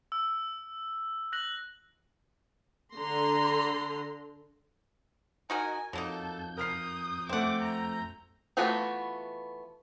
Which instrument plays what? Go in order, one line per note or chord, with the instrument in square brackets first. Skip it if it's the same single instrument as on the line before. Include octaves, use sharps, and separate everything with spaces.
[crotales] E6
F#6 A#6 F#7
[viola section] D3 A#5 C6
[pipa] D#4 F#4 A#4 [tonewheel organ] D#5 [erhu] G#5
[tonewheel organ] F2 G6 [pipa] F#3 A#3 D#4 [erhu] A4
[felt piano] A#4 F6 C7 [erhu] D#6
[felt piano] A3 C4 [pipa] E5 F#5 [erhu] D6
[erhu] A#5
[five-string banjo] E3 A3 B3 F4 F#4